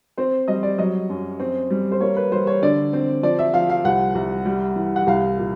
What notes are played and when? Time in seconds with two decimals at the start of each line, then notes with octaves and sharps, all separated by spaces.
0.17 C4 C5
0.48 G3 D#5
0.63 D5
0.78 F#3 D#5
1.10 F#2
1.40 C4
1.70 G3
1.92 C5
2.00 A#3 C#5
2.16 B4
2.32 G3 C5
2.47 C#5
2.63 D3 D5
2.93 C4
3.23 F3 D5
3.39 E5
3.54 F3 F5
3.70 F5
3.85 C2 F#5
4.15 C2
4.46 G3
4.76 E3
4.96 F#5
5.07 C2 F5
5.38 A#2